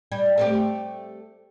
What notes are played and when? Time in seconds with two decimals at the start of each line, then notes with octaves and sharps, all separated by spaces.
0.12 G3
0.38 A3 C4 G4